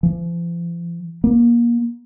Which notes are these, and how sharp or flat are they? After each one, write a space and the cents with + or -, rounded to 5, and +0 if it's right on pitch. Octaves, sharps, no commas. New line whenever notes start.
F3 -45
A#3 +25